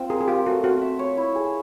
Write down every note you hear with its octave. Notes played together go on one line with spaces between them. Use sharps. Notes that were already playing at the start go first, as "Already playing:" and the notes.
Already playing: C4 F4
G#4 A#4
G#4
F4 G4
A3 F#4
C4 F#4
E5
C#5
E4
G#4